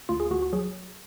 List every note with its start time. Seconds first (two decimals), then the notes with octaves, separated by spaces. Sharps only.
0.09 D2 F4
0.20 G#4
0.30 D2 F#4
0.42 F#4
0.53 F#3 G#4